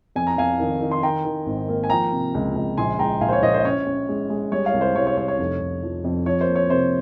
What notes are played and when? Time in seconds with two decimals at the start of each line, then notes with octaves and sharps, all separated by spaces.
0.16 F2 G#5
0.27 A#5
0.38 F2 F5 G#5
0.60 D#3
0.81 D#3
0.91 C6
1.03 D#3 G5 A#5
1.25 D#3
1.46 G#1
1.69 A#3
1.84 G#5
1.90 F3 G5 A#5
2.12 C3
2.34 C#2
2.56 C#2
2.77 A#1 G#5 C6
2.99 G#3 G5 A#5
3.21 A#1 F5 G#5
3.28 C5
3.33 C#5
3.42 A#1 C5 D#5
3.54 C5
3.60 D#5
3.64 C#4 C#5
3.87 C#4
4.09 G#3
4.30 G#3
4.52 G3 C#5
4.66 C#5 F5
4.74 C2
4.81 C5
4.96 C2 C#5
5.07 C#5
5.17 C2 C#5
5.28 C#5
5.39 F1
5.61 F1
5.83 F3
6.04 F2
6.26 F3 C#5
6.41 C5
6.48 A#3
6.55 C#5
6.70 C3 C5